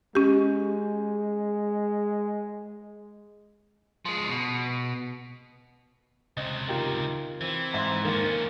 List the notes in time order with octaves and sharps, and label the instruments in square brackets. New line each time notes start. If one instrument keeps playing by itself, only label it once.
[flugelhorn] G#3 [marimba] C#4 G4
[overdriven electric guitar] F3 G#3
B2
[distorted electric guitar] C#2 C3 [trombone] C4 [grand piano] D#5
[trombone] D#4 [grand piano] F4 G4 A#4
[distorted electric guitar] E3 [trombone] C4
[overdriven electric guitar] G#2 [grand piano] E5 C6
[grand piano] D#3 [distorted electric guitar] F3 C#4 [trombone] A#3